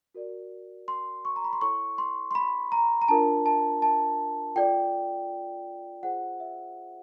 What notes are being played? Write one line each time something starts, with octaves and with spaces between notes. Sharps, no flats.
F#4 A#4 D5
C6
C#6
A#5
B5
C6
E4 A4 C#5 C#6
C6
C6
B5
A#5
A#5
D4 F4 A#4 A5
A5
A5
F4 A4 D5 G5
F4 G#4 C5 F#5
E5